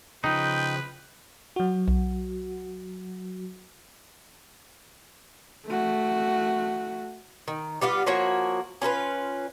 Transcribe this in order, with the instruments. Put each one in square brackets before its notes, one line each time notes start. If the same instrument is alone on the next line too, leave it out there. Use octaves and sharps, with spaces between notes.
[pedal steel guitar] C#3 F3 [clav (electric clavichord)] D#4 [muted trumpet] B4 [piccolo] G5
[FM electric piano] F#3 F#4
[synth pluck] B1
[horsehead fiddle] A3 F#4
[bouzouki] D#3
G3 B3 F4 F5
F3 A#3 F#4 C#5
C#4 F4 A#4 B4